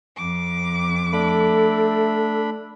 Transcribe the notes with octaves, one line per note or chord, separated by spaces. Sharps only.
F2 D6
A3 D4 A4 B5